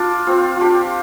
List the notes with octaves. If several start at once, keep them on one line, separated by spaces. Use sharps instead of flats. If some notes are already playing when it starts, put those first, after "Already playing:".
Already playing: D4 F4
C4 F4
D4 F4 G4